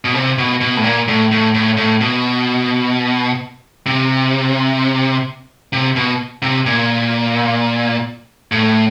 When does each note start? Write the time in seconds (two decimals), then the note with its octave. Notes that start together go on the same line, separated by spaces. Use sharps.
0.05 B2
0.14 C3
0.38 B2
0.61 B2
0.77 A2
0.84 A#2
1.08 A2
1.32 A2
1.54 A2
1.77 A2
2.01 B2
3.86 C3
5.73 C3
5.96 B2
6.42 C3
6.66 A#2
8.52 A2